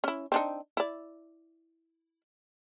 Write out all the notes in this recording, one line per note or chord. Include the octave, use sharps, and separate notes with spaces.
C#4 E4
C4 D4 D#4
E4 D5